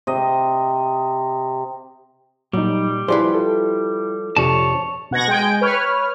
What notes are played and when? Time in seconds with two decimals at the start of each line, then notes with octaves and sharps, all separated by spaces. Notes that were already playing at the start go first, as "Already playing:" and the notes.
0.07 C3 D#5
2.53 A#2 F#3 G3 D#4
3.08 F3 E4 G4 G#4 B4 C5 D5 C6
3.34 F4 A4
4.37 F2 C3 D4 C#5 A5
5.11 B2 F#5 G#6 A#6
5.27 G#3 G5 G#5 D7
5.61 B4 C#5 F6